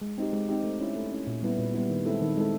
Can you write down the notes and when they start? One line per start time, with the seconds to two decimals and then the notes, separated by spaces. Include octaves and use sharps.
0.02 G#3
0.18 C4 D#4 G4
0.33 G#3
0.49 C4 D#4 G4
0.64 A3
0.80 C#4 E4
0.96 A3
1.12 C#4 E4
1.27 A#2
1.43 G3 B3 E4
1.58 A#2
1.74 G3 B3 E4
1.90 D#3
2.06 G#3 C4 E4 A4
2.21 D#3
2.37 G#3 C4 E4 A4